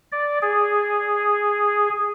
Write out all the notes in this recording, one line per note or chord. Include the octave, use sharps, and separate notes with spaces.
D5
G#4